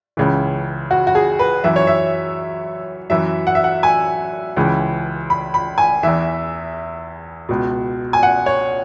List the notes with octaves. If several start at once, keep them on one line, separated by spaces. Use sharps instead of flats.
C#2 C#3 E3
F#4
F#4
G#4
B4
F#2 E3 E5
C#5
E5
F#2 E3 E5
F#5
E5
F#5
G#5
C#2 C#3 E3
B5
B5
G#5
E2 E3 E5
C#2 B2
G#5
F#5
C#5